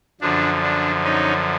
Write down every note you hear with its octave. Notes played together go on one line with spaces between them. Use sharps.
F#2 D3 F3 D4
D4
C#4 D#4